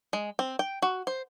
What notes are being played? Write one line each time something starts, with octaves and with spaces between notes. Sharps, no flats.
G#3
C4
G5
F#4
C5